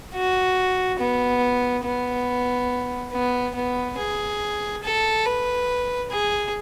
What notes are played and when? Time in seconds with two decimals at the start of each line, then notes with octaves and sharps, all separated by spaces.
0.15 F#4
0.99 B3
1.84 B3
3.12 B3
3.55 B3
3.98 G#4
4.84 A4
5.25 B4
6.11 G#4